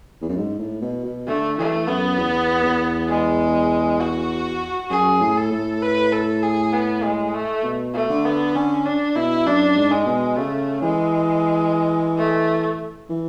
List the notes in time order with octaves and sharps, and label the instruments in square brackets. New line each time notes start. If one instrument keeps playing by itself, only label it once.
[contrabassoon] E2
F#2
G#2
A2
B2
B2
[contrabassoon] D3 [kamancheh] A3
[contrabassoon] E3 [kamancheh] A3
[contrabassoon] F#2 [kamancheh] B3
[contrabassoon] E2
E2
[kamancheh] G#3
F#4
[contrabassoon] F#2 [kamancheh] G#4
[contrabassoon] A2
[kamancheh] A4
[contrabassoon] A2
[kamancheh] B4
A4
G#4
B3
G#3
A3
[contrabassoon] B2
[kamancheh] A3
[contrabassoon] D3
[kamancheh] B3
[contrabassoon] D3 [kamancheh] C#4
[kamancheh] D4
[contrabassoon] B2 [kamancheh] E4
[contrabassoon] F#2 [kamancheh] D4
[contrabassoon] G#2
[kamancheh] G#3
[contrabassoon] B2
[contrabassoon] C#3 [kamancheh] A3
[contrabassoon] E3 [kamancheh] G#3
[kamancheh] A3
[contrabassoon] E3